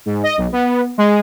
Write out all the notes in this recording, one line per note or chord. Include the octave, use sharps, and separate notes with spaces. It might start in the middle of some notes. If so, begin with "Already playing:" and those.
G#2
D#5
B1
B3
G#3